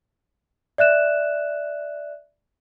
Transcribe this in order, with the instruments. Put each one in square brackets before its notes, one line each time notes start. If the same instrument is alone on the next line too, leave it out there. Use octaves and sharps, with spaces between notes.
[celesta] D5 E5 F#6 E7